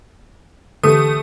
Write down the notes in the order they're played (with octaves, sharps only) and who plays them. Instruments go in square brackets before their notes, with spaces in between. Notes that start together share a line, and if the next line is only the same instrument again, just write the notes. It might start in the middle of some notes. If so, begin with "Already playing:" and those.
[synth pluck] D3 E3 G4 [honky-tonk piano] A3 [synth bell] D#6